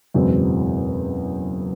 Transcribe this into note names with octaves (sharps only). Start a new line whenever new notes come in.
F#1 E2 B2 G#3 C4